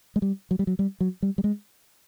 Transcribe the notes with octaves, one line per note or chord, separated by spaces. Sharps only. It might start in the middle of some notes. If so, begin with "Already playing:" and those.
G#3
G3
F#3
G3
F#3
G3
F#3
G3
G3
G#3